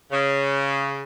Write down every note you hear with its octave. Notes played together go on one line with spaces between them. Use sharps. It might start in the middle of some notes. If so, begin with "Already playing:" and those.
C#3